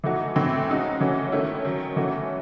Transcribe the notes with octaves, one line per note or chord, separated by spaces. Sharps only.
E3 A3 D#4 F#4
A2 E3 A3 C4
C#3 G#3 D#4 F#4
E3 A3 C#4 F#4
D#3 A3 C#4 E4
D#3 F#3 C#4
E3 A3 C#4 F#4